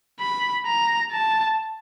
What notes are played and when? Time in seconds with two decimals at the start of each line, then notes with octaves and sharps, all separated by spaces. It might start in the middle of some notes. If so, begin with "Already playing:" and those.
0.20 B5
0.66 A#5
1.11 A5